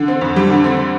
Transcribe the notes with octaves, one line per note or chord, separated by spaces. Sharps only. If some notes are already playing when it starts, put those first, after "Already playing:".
Already playing: D3
C4
F2
G3
D3
C4